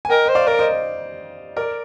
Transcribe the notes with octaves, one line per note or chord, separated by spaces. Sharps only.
G#5
A#4 D#5 G5
C5 D#5
D5 F5
A#4 D5
C5 D#5
A#4 D5